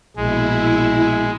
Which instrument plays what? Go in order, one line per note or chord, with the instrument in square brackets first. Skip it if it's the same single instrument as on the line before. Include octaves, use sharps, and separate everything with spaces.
[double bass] A#1 B2 [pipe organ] G#3 [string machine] E4